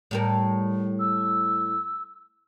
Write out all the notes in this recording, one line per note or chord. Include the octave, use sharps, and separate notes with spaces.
A2 G3 A#4
E6